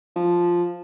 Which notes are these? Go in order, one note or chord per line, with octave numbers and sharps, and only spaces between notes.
F3